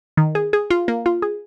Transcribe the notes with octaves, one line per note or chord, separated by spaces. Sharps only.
D#3
G#4
G#4
F4
A#3
F4
G#4